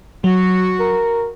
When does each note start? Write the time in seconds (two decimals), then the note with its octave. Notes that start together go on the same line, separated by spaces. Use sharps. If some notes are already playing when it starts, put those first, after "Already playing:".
0.24 F#3 F#4
0.80 A#4